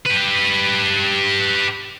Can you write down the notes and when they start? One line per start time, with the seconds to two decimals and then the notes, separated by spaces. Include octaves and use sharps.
0.06 G4 B4